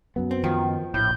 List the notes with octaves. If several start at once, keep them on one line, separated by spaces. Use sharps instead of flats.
F#2 F#3 B3
C4
D#3 F3
A#1 A2 G6